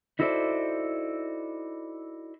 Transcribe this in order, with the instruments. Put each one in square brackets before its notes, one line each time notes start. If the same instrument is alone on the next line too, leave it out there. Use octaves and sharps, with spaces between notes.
[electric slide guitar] D#4 E4 F#4 A4 C5 D5